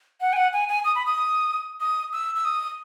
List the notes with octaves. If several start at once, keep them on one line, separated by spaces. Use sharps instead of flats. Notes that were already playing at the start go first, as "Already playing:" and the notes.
F#5
G#5
F#5
G#5
G#5
D#6
B5
D#6
D#6
E6
E6
D#6